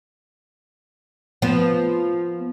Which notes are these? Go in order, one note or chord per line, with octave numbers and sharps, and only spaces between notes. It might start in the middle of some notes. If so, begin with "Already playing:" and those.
F3 B3